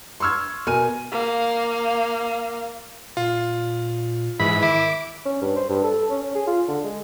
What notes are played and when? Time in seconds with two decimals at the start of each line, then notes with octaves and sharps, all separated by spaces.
0.20 C6 C#6 E6 F6 G#6
0.67 B2 A#4 G#5 F6 D#7
1.12 A#3 F5
3.17 A#2 F4
4.39 G#2 E3 B5
4.63 D#3 E4 D6
5.25 C#4
5.42 G2
5.56 C5
5.69 G2
5.84 A4
6.10 C#4
6.23 C#4
6.35 G#4
6.48 F4
6.68 D3
6.84 G#3